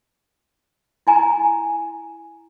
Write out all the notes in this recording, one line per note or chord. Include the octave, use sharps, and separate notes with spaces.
E4 G#5 A#5